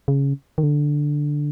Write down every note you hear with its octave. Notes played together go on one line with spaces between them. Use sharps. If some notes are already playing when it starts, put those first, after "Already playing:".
C#3
D#3
D3